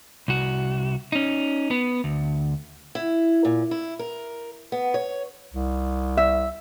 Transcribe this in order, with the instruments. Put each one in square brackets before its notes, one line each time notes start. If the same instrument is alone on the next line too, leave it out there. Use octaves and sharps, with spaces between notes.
[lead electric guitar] C2 F#4
C#4 D#4
B3
D2
[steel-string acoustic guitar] E4
A#2
E4
A#4
B3
C#5
[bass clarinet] C2
[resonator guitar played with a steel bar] E5